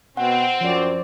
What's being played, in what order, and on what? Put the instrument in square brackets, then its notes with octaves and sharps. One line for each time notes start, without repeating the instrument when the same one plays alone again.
[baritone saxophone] B2 [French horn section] C4 [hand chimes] F#5
[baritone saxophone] F#2 [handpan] F3 C#5 D5